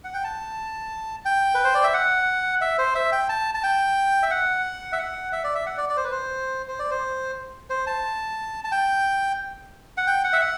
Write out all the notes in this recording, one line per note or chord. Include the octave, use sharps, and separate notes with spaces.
F#5
G5
A5
G5
B4
C5
D5
E5
F#5
E5
C5
E5
G5
A5
A5
G5
E5
F#5
E5
F#5
E5
D5
E5
F#5
D5
D5
C5
B4
C5
C5
D5
C5
C5
A5
A5
G5
F#5
G5
F#5
E5
F#5